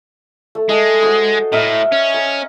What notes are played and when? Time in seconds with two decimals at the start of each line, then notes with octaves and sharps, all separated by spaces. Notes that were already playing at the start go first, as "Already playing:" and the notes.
0.55 A3
0.69 G#3 A4 D#5 G#5
1.03 F#4 C5
1.52 A2 A#4 D#5 E5
1.92 C#4
2.14 A#4